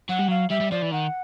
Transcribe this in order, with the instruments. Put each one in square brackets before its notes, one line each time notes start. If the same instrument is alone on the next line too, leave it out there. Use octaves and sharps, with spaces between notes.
[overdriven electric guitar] F#3 [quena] F#5
[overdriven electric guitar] G3
[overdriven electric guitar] F#3 [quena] F5
[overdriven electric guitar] G3 [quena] E5
[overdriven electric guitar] G3
[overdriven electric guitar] F3 [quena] D5
[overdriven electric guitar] E3
[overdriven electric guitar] D#3 [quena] F#5